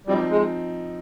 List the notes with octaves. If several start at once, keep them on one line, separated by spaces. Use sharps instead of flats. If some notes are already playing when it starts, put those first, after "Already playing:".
F3 G3 C4 D#4
G#3